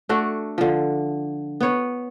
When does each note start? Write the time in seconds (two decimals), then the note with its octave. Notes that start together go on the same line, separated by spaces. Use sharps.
0.09 A3 D4 F#4
0.58 D3 F3
1.61 B3 C#5